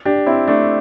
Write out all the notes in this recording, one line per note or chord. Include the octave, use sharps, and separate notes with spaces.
D4 G4
C4 E4
A3 D4